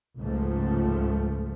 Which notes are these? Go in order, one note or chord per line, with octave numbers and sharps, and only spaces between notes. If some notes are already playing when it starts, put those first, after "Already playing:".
C#2 G#2 F3 A3